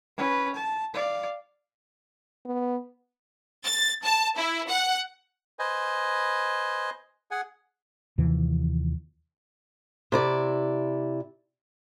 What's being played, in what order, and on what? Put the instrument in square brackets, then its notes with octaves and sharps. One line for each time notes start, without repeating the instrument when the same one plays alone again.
[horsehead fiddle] C#4 B4
A5
D5 F5
[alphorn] B3
[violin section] A6
A5
E4
F#5
[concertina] B4 C5 D#5 G#5
G#4 F#5 G#5
[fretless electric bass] D#2 C3 E3 F3
[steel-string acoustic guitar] C3 E4 D5